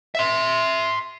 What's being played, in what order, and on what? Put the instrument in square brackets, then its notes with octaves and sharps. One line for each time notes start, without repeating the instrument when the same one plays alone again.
[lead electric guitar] E5 C6